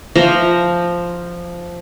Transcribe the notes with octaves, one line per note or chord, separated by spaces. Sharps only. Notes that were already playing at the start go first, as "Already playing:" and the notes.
F3 A#5